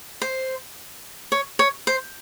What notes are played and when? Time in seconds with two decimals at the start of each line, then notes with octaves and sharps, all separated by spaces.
0.22 C5
1.32 C#5
1.59 C#5
1.87 C5